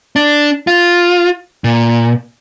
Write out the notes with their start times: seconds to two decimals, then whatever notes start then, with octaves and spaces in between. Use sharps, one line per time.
0.16 D4
0.67 F4
1.64 A#2